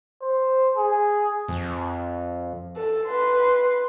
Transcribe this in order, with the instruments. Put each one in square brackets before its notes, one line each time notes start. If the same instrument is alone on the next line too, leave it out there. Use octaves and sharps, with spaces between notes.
[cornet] C5
G#4
[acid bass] F2
[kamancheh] A4
B4 C6